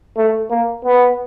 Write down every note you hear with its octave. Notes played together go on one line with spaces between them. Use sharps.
A3
A#3
B3